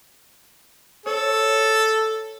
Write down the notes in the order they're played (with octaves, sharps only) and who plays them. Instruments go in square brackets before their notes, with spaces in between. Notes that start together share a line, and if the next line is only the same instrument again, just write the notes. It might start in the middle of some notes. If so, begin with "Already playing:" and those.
[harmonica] A4 [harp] C#5